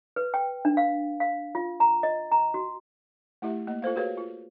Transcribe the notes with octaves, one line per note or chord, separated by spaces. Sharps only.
B4
G5
D4
F5
F5
F4
A#5
D#5
A#5
F#4
A3 E4 G4 E5
A#3 D#5
F4 A4 C5 F5
F#4 G#4 B4 C#5 F5
F4